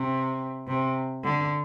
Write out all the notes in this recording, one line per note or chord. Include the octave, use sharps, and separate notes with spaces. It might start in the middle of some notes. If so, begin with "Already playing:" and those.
Already playing: C3
C3
D3